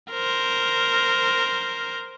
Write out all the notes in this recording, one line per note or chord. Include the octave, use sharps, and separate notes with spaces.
A#4 C5